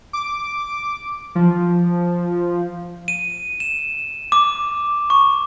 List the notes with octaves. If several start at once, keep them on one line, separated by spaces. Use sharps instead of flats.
D6
F3
D#7
E7
D6
C#6